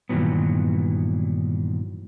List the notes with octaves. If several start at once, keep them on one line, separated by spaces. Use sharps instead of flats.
G2 A#2 D#3 E3 F#3 B3